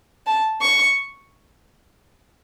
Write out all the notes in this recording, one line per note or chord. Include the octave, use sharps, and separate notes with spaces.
A5
C#6